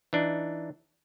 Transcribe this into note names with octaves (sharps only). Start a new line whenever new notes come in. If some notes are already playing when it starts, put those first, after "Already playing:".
E3 D4 D#4